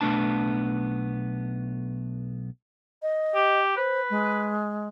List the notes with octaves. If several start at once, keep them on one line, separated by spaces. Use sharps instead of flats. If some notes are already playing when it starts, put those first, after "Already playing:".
B1 A3 B3 D4 A5
D#5
G4
B4 C5
G#3